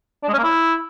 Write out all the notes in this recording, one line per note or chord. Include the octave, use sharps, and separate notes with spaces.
D4
G#3
C#4
A#3
E4